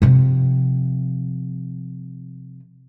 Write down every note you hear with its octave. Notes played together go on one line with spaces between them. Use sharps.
C3 F3